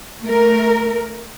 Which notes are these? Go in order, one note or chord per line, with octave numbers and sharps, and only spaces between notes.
A3 A#4